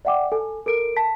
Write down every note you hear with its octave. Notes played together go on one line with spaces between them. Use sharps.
D5 E5 F#5 G5 D6
A4 G#5
A4 A#4 D7
A5 B6